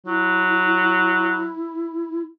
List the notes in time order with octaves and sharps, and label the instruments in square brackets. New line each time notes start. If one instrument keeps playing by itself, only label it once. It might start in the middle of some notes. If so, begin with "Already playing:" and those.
[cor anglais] F#3 [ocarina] E4